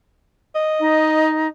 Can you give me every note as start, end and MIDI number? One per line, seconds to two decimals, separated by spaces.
0.55 1.29 75
0.80 1.47 63